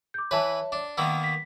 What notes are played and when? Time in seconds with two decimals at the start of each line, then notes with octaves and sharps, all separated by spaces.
0.14 D6 G6
0.31 E3 B4 C#5 E5 A5
0.72 D4
0.98 D#3 A#3 B3 E6
1.24 B6